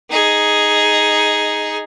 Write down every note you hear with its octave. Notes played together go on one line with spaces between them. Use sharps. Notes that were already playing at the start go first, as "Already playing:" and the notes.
D#4 G#4